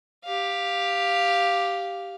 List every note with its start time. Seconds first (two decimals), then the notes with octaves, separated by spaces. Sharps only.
0.24 G4 F5